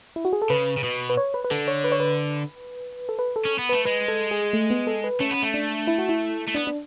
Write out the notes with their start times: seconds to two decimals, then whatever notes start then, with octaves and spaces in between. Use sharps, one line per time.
0.16 E4
0.25 F#4
0.33 G#4
0.42 A4
0.50 C#3 B4
0.77 C#3
0.83 B2
1.10 B4
1.17 C#5
1.34 B4
1.45 B4
1.51 D3 A4
1.68 C#5
1.84 B4
1.92 C#5
2.00 B4
3.09 A4
3.19 B4
3.36 A4
3.45 C#4
3.59 B3
3.69 A3 B4
3.85 G#3 B4
4.08 A4
4.31 G#4
4.53 A3
4.70 B3
4.87 A4
5.04 B4
5.20 A3 C#4
5.31 B3
5.42 A3
5.54 D4
5.87 E4
5.98 F#4
6.09 E4
6.48 A3
6.55 B3 D4
6.67 D4